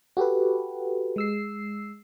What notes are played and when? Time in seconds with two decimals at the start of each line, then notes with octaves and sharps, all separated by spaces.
0.17 F#4 G4 A4 B4
1.16 G#3 E6 C7